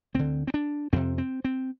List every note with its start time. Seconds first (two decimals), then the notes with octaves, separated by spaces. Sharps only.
0.14 D2 D3 C4
0.47 C4
0.54 D4
0.93 F2 C3 C4
1.18 C4
1.45 C4